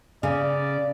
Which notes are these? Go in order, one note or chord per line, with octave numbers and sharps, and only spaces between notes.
C#3 D5